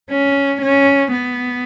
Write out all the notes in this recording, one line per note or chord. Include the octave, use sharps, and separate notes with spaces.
C#4
C#4
B3